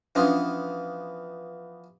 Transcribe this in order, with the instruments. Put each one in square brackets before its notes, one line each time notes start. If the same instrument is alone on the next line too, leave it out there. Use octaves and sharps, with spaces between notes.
[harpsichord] E3 F3 B3 [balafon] C#4 D4